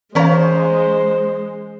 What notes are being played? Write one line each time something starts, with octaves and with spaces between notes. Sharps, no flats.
E3 G#3 C#4 C5 C#5 F5 A#5